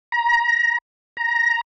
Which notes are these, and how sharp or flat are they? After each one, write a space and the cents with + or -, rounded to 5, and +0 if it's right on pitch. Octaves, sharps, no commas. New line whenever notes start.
A#5 +25
A#5 +10